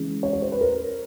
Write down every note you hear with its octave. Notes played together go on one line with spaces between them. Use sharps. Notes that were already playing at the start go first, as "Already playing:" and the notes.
Already playing: C#3 E3 G#3
C#5
C#5
C5
B4
A#4